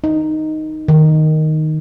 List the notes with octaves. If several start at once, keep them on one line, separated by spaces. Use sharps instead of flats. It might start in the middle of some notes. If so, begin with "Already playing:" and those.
D#4
D#3